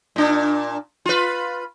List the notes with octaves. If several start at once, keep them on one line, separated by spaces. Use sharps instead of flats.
A#2 D4
F4 B4